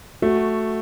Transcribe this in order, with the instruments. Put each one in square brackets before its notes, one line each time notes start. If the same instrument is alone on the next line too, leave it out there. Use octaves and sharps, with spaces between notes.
[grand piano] A3 [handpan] F#4